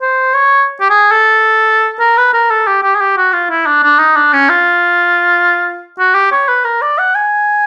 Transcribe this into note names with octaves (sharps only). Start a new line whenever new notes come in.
C5
C#5
G4
G#4
A4
A#4
B4
A#4
A4
G4
G4
G#4
G4
F#4
F4
E4
D4
D4
D#4
D4
C#4
F4
F#4
G4
C#5
B4
A#4
D5
F#5
G#5